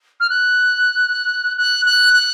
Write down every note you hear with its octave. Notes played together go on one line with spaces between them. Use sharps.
F6
F#6
F#6
F#6
F#6